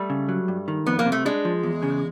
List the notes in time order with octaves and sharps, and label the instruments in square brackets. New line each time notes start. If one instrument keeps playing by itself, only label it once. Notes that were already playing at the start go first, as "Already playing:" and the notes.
Already playing: [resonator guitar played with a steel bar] G3 A3
[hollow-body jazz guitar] C#3
F#3
G2
D#3
[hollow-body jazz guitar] F2 [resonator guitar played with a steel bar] B3
[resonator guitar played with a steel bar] A#3
[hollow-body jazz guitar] C3
[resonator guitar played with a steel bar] A3
[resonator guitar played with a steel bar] G#3 [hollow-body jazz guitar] D4
[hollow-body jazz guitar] F3
E2
C#3